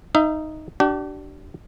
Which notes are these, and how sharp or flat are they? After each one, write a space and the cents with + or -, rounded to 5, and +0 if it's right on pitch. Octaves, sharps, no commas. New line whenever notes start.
D#4 +0 E5 +30
D4 +0 G4 -45